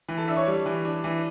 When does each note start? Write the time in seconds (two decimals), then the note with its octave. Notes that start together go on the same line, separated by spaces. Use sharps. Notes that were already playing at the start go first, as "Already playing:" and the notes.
0.09 E3
0.18 A4 A5
0.28 D4 E5 E6
0.37 C#5 C#6
0.47 G3
0.66 E3
0.85 D4
1.04 E3